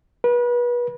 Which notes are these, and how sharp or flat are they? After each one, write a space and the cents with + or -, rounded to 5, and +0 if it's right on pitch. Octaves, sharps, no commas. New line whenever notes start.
B4 -30